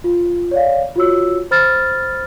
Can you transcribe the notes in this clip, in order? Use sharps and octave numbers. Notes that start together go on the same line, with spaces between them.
F4
C#5 D5 F5
F4 F#4 C#5 E6
C5 B5 F6 A6